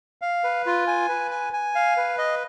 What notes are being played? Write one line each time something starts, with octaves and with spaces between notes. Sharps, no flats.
F5
B4
F4
G#5
B4
G#5
G#5
F5
B4
D#5